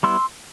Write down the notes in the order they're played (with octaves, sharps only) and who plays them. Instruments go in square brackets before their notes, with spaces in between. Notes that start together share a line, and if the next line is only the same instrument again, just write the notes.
[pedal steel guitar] G3 B3 E4 C6 E6